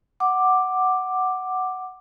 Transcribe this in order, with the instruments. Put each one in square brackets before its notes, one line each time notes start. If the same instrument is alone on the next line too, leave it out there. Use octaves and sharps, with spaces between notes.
[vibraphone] F#5 D6